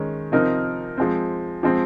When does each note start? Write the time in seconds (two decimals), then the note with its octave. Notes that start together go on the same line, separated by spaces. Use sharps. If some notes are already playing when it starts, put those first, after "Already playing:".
Already playing: D#3 G#3 C#4
0.32 C3 F3 C4 D#4 A#4
0.98 F3 G#3 C4
1.63 F3 G#3 C4